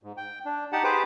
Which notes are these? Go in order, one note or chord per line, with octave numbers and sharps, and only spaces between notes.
G#2
G5
D4
D#4 G4 F#5 A5
G4 G#4 B4 C5 D6